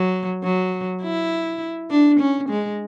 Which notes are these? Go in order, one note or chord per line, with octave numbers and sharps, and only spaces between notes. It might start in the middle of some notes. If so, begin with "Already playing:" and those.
Already playing: F#3
F#3
E4
D4
C#4
G#3